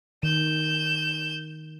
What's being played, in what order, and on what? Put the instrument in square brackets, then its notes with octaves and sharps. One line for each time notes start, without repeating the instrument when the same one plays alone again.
[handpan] D#3 [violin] G6 E7